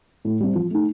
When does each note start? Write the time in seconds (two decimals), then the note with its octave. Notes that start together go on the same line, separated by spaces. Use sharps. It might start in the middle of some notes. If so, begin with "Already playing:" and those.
0.25 A2
0.40 G3 C4
0.55 F3
0.71 A3 D#4